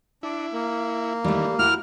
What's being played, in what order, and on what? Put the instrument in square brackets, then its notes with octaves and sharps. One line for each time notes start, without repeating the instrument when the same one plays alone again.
[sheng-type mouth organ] D4 [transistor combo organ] E4
[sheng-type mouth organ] A#3
[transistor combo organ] D#3 E3 [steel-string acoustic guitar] G3 A3
[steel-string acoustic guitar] E4 A#4 [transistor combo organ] F#4 [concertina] F6